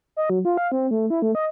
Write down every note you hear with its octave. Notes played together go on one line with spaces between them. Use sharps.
D#5
F#3
F4
F5
C4
A3
E4
A3
D#5